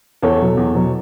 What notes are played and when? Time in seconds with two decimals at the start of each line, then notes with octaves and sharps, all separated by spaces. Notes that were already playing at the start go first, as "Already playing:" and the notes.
0.22 E2 A4 C#5
0.41 B2 F#3
0.57 E2
0.74 B2 F#3